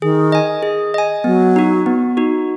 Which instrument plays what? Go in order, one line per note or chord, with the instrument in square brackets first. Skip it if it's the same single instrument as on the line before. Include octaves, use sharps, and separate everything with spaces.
[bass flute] D#3 [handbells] G#4
[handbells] D#5 G#5
G#4
D#5 G#5
[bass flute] F#3 [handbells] B3
[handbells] D#4 F#4
B3
D#4 F#4